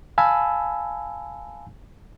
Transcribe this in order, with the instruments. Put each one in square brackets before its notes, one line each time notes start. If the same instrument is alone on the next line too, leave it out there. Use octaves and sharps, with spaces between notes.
[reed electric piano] F5 G#5 A5 B5 E6